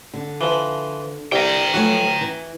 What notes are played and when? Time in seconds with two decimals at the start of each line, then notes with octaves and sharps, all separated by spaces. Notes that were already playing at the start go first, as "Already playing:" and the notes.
0.14 D3
0.41 E3 F3
1.32 C2 G5 A#5
1.74 F3 F#3 A3 F#4 G#5
2.21 E3